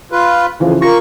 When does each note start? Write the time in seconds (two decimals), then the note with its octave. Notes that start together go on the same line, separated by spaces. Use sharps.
0.12 F4 B4
0.60 F2 C#3 E3 F3
0.82 A#3 F4 C#6 A#6